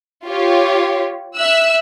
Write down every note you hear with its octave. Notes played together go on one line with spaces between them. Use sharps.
F4 G4 C#5
E5 E6 F#6